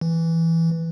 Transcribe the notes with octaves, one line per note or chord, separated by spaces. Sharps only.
E3